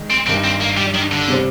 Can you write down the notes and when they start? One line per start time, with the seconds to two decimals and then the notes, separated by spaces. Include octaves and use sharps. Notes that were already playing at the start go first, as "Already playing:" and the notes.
Already playing: D#3 G#3 D#4
0.11 C4
0.27 G2 D#3 G3 C4
0.44 C4
0.61 A#3
0.77 G3
0.94 D#3
1.11 D3
1.28 C3 G3 C4